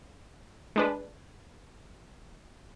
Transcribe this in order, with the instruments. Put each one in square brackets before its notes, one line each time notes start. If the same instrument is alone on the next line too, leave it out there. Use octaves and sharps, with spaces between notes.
[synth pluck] G#3 D4 B4